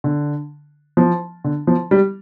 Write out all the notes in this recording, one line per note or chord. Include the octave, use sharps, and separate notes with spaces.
D3
F3
D3
F3
G3